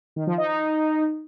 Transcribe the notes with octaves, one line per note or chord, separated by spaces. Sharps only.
D#3
F3
D#4
D#4